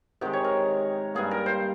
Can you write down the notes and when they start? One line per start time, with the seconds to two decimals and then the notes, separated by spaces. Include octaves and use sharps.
0.21 C3 D#3 G#3 G4
0.33 C#5
0.44 A#4
1.15 G2 G3 A#3 G#4
1.31 A#4
1.46 C5